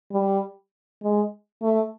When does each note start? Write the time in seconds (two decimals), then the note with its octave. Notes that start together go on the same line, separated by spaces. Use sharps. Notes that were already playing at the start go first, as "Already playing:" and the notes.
0.11 G3
1.02 G#3
1.62 A3